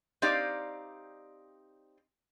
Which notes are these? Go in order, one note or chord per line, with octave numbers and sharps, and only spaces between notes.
C4 D#4 G4 D5 F5